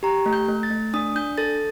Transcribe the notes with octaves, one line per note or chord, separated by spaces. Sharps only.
G4 A#5
A3
G6
A3
A6
A3
D4 D#6
D4 G6
A4 A6